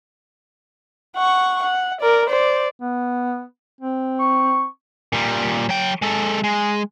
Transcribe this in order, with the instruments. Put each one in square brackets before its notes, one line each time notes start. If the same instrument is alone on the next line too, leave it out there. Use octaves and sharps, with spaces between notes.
[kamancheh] F#5 C#6
F#5
A#4 D5
C5 D5
[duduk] B3
C4
[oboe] C#6
[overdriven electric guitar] A#2 G3
F#3 G5
G#3 A4
G#3